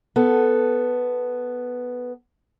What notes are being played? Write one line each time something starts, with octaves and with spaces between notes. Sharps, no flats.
B3 A4